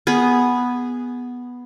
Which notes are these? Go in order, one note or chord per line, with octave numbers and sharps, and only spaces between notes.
B3 G#4